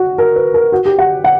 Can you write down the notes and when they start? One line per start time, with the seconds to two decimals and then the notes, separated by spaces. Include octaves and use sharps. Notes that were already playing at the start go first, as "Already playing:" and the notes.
Already playing: F#4
0.18 A#4
0.36 B4
0.54 A#4
0.72 F#4
0.86 G4
0.98 F#5
1.24 F#5